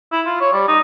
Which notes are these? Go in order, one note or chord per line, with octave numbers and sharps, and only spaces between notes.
E4
F4
C#5
G3
D#4